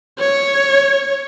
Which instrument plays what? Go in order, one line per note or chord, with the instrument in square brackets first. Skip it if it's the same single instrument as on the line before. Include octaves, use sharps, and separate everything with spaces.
[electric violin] C#5